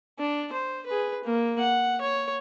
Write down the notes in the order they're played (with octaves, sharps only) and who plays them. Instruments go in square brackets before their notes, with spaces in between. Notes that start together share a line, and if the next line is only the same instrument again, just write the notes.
[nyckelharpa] D4
C5
G#4 B4
A#3
F#5
C#5